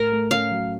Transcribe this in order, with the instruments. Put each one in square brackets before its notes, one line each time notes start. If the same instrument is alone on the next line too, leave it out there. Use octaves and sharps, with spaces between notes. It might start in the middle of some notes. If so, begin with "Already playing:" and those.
Already playing: [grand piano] A2 [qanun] A#4
[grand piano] A3
[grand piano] C#4 [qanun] F5
[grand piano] F#3